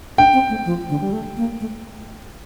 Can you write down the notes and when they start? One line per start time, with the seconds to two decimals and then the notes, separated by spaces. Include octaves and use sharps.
0.18 D4 G5
0.33 C4
0.49 A3
0.65 F3
0.89 D3
1.01 G3
1.13 A3
1.37 A#3
1.60 A3